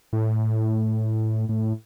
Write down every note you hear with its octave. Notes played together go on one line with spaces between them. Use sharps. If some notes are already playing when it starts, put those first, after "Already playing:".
A2
A2